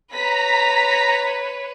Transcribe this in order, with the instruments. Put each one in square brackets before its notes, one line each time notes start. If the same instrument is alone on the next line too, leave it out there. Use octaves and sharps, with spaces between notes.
[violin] B4 C#5 [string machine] A#5 [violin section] B6